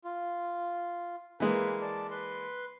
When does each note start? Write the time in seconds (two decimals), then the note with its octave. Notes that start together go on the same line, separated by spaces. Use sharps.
0.04 F4
1.40 E3 G#3 A#3 B4
1.81 D5 A5
2.11 B4 C6